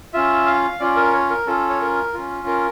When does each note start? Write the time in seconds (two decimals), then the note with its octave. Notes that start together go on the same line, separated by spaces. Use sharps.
0.13 C#4 F4 E5
0.46 F5
0.80 C#4 F4 D5
0.96 A#4
1.13 C#5
1.30 A#4
1.46 C#4 F4 A4
1.69 C#5
1.80 A#4
2.14 C#4 F4
2.47 A#4